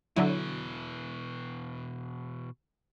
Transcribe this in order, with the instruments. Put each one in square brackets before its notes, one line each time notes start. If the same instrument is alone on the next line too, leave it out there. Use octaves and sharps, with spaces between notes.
[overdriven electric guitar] B2 E3 [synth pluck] D3 F#3 E4